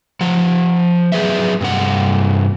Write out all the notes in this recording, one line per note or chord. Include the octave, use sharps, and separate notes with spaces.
F3 F#5
F#3 G#4 B4 E5
G2 C3 F#5